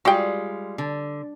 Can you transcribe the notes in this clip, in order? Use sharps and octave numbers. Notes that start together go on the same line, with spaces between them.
G3 G#3 F4 F#4 G5
D3